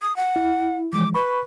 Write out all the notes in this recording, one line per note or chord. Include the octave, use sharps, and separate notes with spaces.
D#6
F#5
E4
E3 F3 G#3 D6
B4 B5 C#6